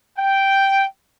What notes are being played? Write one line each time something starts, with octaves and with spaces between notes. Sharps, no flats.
G5